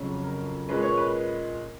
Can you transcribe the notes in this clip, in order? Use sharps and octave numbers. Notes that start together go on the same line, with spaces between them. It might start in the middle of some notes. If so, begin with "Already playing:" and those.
Already playing: F2 C#3 F#3 C#4
A#4
A#2 G#3 C#4 B4
C#5
B4